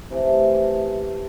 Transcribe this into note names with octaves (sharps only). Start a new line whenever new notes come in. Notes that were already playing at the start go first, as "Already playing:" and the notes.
C3 E3 A3